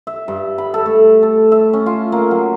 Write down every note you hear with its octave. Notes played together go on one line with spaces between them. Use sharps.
E5
G2
B5
A4
A3
A4
E5
C#4
F4
A#3
F#3